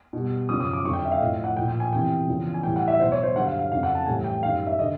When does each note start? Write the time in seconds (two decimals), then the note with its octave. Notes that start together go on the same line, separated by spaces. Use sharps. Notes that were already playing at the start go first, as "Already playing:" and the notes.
0.13 B2 G3
0.49 F#2 C#3 F3 D#6
0.60 D#6
0.73 D6
0.85 F2 D3 F#3 C#6
0.93 G5
1.05 E5
1.12 F5
1.20 A2 F3 D#5
1.44 F#5
1.57 A#2 F3 G5
1.68 G5
1.80 G#5
1.92 E2 C3 E3 G5
2.28 E2 C#3 F3
2.54 G#5
2.63 A2 E3 G3 G5
2.76 F#5
2.88 E5
2.99 B2 C5
3.04 F#3
3.12 C#5
3.23 C5
3.36 G2 D3 F#3 F#5
3.47 F5
3.59 F5
3.72 F2 C#3 F#3 F5
3.83 F#5
3.95 A5
4.06 A2 E3 G3 G#5
4.24 G5
4.43 F#2 D#3 G3 F5
4.67 E5
4.79 D3 D#5